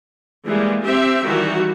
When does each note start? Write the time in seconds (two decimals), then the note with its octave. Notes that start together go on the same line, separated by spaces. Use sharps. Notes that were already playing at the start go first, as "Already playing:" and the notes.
0.45 E3 G3 G#3 A#3
0.84 C4 G4 E5
1.24 D#3 E3 G3 F#4 G4